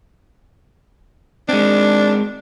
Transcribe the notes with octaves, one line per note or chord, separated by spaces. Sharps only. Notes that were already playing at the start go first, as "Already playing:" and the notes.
G#3 C4 D4